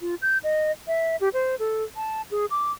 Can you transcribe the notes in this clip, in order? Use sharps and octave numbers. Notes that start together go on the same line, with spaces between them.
F4
G6
D#5
E5
G4
C5
A4
A5
G#4
D6